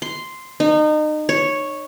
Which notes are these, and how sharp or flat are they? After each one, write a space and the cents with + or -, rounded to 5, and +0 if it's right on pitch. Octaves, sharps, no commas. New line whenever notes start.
C6 -5
D#4 -30
C#5 -5